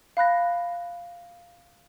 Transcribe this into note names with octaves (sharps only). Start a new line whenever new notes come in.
F5 B5 F#6 A#6